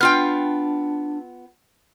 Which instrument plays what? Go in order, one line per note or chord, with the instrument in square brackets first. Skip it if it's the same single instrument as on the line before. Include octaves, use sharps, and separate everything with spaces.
[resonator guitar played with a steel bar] B3 F4 G5 [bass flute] D4 [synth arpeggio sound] F6